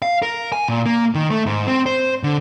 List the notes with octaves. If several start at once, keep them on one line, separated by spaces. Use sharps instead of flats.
F5
A#4
G#5
A#2
A#3
D#3
A3
G#2
C4
C5
D3